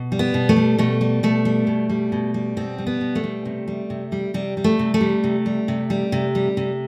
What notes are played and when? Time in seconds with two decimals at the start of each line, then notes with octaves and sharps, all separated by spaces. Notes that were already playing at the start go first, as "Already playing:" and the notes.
Already playing: B2
0.12 G3
0.19 B3
0.34 B2
0.49 A3
0.57 G3
0.78 B2 A3
1.01 G3
1.23 B2 A3
1.45 G3
1.67 B2
1.90 G3
2.12 B2
2.34 G3
2.57 B2 C4
2.78 G3
2.87 B3
3.01 B2
3.15 A3
3.24 G3
3.45 C3
3.68 G3
3.90 C3
4.12 G3
4.34 C3 G3
4.57 G3
4.64 A3
4.79 C3
4.94 A3
5.01 G3
5.24 C3
5.46 G3
5.68 C3
5.90 G3
6.12 C3
6.35 G3
6.57 C3